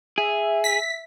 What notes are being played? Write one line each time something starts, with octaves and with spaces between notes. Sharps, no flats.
G#4 E5
B6